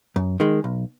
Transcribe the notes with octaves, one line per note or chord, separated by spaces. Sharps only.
F#2
D#3 G#3
B1